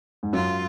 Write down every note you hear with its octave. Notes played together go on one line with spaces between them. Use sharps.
G#2
F#2 F4